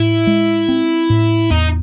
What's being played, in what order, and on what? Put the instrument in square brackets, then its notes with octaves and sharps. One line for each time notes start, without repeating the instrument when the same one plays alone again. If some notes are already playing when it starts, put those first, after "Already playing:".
Already playing: [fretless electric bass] A2 [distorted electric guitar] E4
[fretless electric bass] G#3
C4
A2
[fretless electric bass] E2 [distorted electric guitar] D#4